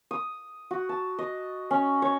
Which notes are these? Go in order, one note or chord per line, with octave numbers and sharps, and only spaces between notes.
D#6
F#4
A5
D#5
C#4
C#5